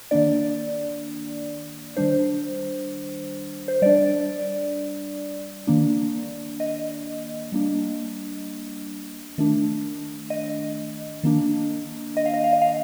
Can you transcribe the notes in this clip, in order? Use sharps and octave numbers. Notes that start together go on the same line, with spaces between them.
D#3 A#3 D4 D5
D#3 G3 D4 C5
C5
G3 D4 D5
D#3 A#3 D4
D#5
G3 A#3 D4
D#3 A3 D4
D#5
D#3 A#3 D4
D#5
F5
D#5
F5
D#5
F5